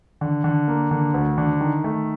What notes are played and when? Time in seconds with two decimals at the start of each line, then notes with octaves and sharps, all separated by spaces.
0.21 D3
0.44 D3
0.68 A#3
0.91 D3
1.14 D2
1.38 D3
1.61 D#3
1.84 A3